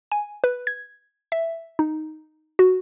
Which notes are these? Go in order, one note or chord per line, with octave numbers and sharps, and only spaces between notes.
G#5
B4
G#6
E5
D#4
F#4